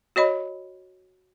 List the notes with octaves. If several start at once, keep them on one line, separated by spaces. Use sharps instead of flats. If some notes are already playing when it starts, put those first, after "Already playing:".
F#4 C#5 D#5 B5